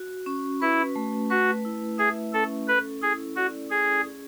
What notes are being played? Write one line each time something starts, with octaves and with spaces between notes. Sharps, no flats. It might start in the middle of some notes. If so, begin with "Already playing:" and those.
Already playing: F#4
C#4
E4 B4
A3
F#4 B4
E4
G#4 E5
C#4 A4
A4 B4
E4 G#4
F#4 D5
C#4 G#4
G#4